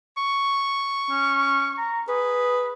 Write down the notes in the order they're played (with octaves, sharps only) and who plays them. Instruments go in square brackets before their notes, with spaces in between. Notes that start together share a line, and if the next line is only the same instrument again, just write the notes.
[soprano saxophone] C#6
[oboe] C#4
A#5
[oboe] G#4 [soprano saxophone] B4